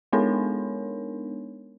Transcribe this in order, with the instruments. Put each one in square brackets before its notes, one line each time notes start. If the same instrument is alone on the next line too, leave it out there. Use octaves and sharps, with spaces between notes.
[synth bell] G#3 B3 D4 D#4 A#4 C#5